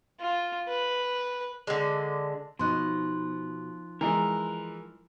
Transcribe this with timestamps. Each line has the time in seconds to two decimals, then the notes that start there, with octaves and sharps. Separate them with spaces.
0.20 F4
0.69 B4
1.67 D3 G#3
2.59 B2 F3 D#4 C6 F#6
4.01 E3 G#3 A#4